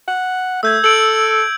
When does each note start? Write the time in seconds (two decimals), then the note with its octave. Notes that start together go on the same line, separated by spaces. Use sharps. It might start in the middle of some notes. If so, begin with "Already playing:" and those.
0.08 F#5
0.63 A3 E6 G6 G#6
0.84 A4 D7 F#7